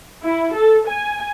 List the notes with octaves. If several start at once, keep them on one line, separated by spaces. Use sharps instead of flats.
E4
A4
G#5